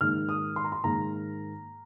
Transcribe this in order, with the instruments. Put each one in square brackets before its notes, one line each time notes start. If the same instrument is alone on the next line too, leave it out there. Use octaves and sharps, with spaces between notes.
[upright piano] G#2 D#3 A#3 D#4 F6
D#6
C6
A#5
C6
G#2 D#3 A#3 D#4 A#5